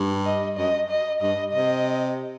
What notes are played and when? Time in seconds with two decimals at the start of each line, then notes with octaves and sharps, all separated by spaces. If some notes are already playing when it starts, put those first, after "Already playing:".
Already playing: G2
0.25 D#5
0.57 F#2 D#5
0.89 D#5
1.21 G2 D#5
1.53 C3 D#5